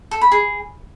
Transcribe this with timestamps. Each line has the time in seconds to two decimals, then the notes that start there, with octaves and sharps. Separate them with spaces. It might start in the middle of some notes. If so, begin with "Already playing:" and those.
0.11 A4
0.21 B5
0.32 G#4